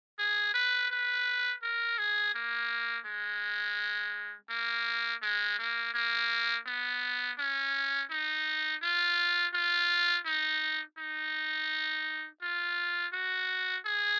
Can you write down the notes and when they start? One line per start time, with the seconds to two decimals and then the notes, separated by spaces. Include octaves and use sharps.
0.19 G#4
0.54 B4
0.91 B4
1.63 A#4
1.98 G#4
2.35 A#3
3.06 G#3
4.50 A#3
5.22 G#3
5.59 A#3
5.94 A#3
6.67 B3
7.39 C#4
8.11 D#4
8.83 F4
9.54 F4
10.26 D#4
10.98 D#4
12.42 F4
13.13 F#4
13.85 G#4